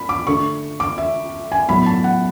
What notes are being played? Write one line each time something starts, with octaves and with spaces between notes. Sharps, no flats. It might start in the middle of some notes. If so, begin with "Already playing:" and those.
Already playing: B5
D6
D3 A3 C#6
D6
E5
G#5
A2 F#3 B3 B5
A5
F#5